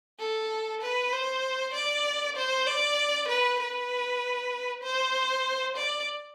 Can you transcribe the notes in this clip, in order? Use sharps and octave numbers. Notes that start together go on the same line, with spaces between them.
A4
B4
C5
D5
C5
D5
B4
B4
C5
D5